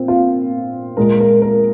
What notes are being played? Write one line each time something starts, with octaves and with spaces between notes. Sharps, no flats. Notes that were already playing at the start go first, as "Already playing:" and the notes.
Already playing: A#2 C4
F4
A#2 G#3 A#4
A#4
A#4